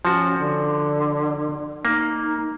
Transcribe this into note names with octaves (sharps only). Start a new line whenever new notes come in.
F3 C#4 F#4
D3
A#3 D#4